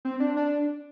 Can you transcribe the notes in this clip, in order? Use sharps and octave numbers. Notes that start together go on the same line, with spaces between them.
C4
D4
D4